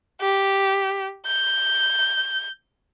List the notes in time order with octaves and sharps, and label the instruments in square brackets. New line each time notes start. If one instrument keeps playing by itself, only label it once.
[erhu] G4
G6